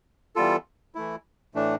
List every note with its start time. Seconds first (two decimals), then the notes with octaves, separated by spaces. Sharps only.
0.36 E3 G3 B3 F4 A4
0.95 E3 A3 E4
1.55 A2 E3 A3 D4